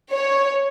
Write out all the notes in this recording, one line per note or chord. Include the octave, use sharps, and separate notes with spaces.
C#5